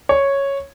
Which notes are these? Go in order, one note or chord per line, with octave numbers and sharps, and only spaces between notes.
C#5